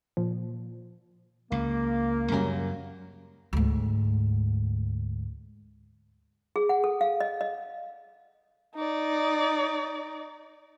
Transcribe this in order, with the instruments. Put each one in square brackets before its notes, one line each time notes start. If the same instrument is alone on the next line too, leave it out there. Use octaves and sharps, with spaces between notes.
[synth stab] A#2 F3
[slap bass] C#2 [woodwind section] A#3
[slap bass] F#2 C#3 F#3 [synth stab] G3 C#4 A#4
[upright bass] D2 G#2
[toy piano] G#4
F#5
A4
F5
D#5
D#5
[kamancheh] D#4 D5